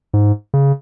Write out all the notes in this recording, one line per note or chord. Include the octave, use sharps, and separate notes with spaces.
G#2
C#3